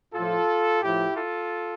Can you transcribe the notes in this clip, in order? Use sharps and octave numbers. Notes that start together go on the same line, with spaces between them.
A2 F3 F4 A4
A2 F3 E4 G4
F4 A4